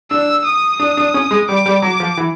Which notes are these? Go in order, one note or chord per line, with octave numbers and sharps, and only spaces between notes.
D4 E6
D#6
D4
D4
C#4
G#3
G3 D6
G3
F#3 D6
F3
E3